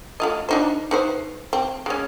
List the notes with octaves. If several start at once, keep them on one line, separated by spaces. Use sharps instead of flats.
A3 F4 D#5
D4 D#4 C5
D#4 B4 C5
C4
G#3 C#4